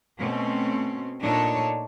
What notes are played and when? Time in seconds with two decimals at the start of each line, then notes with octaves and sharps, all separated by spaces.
0.20 B2 A3 C4 C#4
1.21 A#2 D4 D#4 A4 C#5